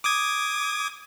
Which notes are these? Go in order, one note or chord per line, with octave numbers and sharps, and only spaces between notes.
D6 D#6 G#6